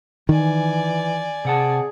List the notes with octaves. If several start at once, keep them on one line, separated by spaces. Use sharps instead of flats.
D#3 E3 D5 G#5
C3 G#4 F#5 A5